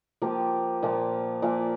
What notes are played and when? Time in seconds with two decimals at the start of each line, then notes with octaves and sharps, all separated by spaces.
0.22 F3 A#3 G4
0.82 A#2 F3 A#3
1.42 A#2 F3 A#3